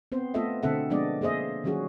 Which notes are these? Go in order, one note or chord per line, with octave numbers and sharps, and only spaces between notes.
B3 C4 C5
A3 B3 F4 A4 D#5 E5
B2 D3 C4 A4 E5 F#5
F3 G#3 B3 D4 D5 D#5
A#3 G#4 C5 D#5 E5
D#3 F#3 G3 C#4 F#4 G#4